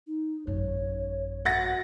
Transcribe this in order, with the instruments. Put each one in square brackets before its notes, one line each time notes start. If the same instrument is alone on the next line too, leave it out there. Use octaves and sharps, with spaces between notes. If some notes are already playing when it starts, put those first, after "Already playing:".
[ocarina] D#4
[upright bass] A1 F#2 [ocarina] C#5
[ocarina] F#4 [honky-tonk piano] F#5 A6 A#6